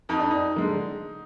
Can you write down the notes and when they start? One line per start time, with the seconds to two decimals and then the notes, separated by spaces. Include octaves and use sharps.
0.09 F2 D#4
0.19 D4
0.31 D#4
0.56 D3 G#3